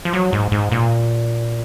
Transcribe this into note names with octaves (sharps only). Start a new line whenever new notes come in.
F3
F#3
G#2
G#2
A#2